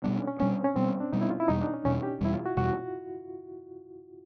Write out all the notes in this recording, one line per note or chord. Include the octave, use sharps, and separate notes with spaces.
B2 G3 B3 D4
C#4
C#4
B2 G3 B3 C#4
C4
C#4
B2 G3 B3 C4
C#4
D4
B2 G3 B3 D#4
E4
F4
E4
E2 B2 G3 D#4
D4
C#4
E2 B2 G3 C#4
G4
E2 B2 G3 E4
F4
F#4
E2 B2 G3 F#4